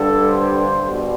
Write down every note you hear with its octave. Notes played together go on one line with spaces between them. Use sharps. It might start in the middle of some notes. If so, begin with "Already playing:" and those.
Already playing: G2 D3 G3 A4
C5
B2 G3